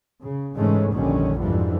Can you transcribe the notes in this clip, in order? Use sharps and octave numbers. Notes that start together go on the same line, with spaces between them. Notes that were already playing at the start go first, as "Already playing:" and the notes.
C#3
G#2 C#3 E3 G#3 A3 C#4
F1 A#1 D3 D#3 G3 C#4
F2 G#2 D3 E3 F3 G3